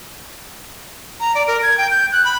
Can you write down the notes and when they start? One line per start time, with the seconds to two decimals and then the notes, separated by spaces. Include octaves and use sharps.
1.20 A#5
1.35 D5
1.47 A#4
1.63 G#6
1.78 G5
1.91 G6
2.12 F#6
2.25 B5